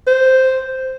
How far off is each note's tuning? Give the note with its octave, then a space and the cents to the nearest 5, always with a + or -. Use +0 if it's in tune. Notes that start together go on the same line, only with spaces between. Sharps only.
C5 -5